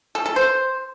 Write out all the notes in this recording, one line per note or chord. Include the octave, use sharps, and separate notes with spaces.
A4
A4
C5